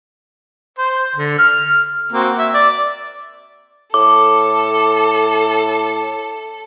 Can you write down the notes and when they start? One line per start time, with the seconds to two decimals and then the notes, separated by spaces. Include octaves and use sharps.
0.78 C5
1.16 D3
1.39 F6
2.12 A#3 C4 F#4
2.38 E5
2.54 D5
3.94 A2 A4 D6